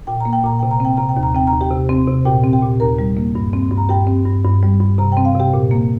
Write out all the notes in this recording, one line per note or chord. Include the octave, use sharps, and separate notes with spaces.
A#2 G5
A#3 A#5
G5
A#2 A#5
C3 G5
A#5
C4 G5
C3 A#5
G5
D#2
A#5
C4 G5
A#5
D#2
G4 G5
C3
C4
C3
A#2 G4 G5
C4
G4 G5
A#2
D#2 A#4 A#5
G3
A#3
G2
C4
G2
A#5
G2 G4 G5
C4
G2
G2
G3
G2
C3 A#5
C4 G5
F5
C3 G4 G5
A#2
A#3